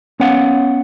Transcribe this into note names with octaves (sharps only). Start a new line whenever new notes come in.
B3 C#4 C#5 F5 F#5